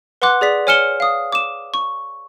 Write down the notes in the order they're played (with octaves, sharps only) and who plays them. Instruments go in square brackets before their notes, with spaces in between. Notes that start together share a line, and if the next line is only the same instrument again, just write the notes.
[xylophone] B4 F#5 C6 D6 F#6
G#4 D5 B6
C#5 G#5 F6 C#7 E7 G7
F5 D#6
D6 E7
C#6